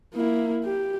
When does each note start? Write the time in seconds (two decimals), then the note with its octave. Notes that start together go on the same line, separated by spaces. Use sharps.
0.14 A#3 E4
0.64 G4